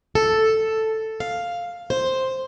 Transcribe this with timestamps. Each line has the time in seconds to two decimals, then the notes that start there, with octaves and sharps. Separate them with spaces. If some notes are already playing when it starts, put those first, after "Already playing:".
0.15 A4
1.20 F5
1.90 C5